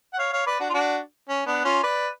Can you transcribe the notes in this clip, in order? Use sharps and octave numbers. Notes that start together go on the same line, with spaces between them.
F#5
C#5 F5
C#5 F5
B4 D5
D4 F#4
F4
D4 F#4
C#4
B3 D4
C#4 F4
B4 D5